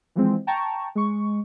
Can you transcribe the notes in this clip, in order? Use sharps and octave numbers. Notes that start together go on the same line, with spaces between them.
E3 F3 G#3 C4
G5 A5 A#5 C#6
G#3 C#6